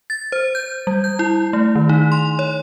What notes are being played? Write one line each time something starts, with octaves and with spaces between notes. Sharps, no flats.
A6
C5
G6
G3
G6
E4
A3
D#3
D#4
C6
C#5